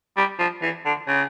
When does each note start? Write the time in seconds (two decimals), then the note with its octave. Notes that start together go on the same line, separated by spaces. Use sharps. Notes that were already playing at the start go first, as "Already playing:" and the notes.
0.17 G3
0.39 F3
0.62 E3
0.85 D3
1.08 C#3